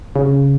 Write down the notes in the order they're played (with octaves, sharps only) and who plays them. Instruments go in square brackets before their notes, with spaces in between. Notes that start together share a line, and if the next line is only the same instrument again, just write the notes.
[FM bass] C#3